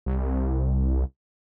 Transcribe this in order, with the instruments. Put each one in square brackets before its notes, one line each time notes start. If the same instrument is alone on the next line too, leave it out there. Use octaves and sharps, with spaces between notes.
[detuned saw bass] C2